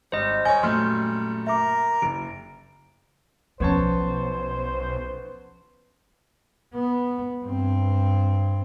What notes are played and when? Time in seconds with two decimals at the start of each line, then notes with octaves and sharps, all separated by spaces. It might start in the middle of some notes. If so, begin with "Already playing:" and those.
0.12 G#1 G3 C5 D#5
0.45 C#5 D#5 G#5 G6
0.63 F#2 A#2 A3 C6 F6
1.47 A#4 E5 A#5 D6
2.02 F#1 D7
3.60 B1 F3 B3 C#4 C5 C#5 A5
6.74 B3
7.43 G2 C4